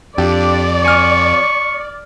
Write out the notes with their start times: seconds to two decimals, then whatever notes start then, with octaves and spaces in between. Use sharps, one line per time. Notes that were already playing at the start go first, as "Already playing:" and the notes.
0.18 F2 D4 G4 D5
0.85 G#5 C#6 F6